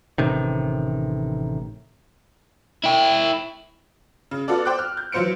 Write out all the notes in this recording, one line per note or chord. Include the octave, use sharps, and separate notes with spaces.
A1 C3 D#3
E4 G5
C#3
B3 F4 F#4 A4 D5
C5 G5 D6 F#6
F6
G6
E3 F#3 F4 C5 C#7 D7